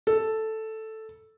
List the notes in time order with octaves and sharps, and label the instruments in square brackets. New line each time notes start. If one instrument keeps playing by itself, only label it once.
[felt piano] A4